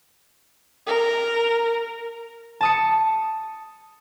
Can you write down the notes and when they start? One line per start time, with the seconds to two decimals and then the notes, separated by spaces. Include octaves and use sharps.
0.87 A#4
2.61 A5 D#6 C#7